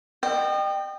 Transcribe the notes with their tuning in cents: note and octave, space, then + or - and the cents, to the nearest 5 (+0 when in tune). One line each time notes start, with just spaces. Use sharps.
D#5 -35 G5 +0